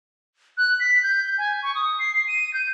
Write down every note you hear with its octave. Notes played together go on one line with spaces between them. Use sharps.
F#6
B6
G6
G#5
C#6
D#6
C7
D#7
G6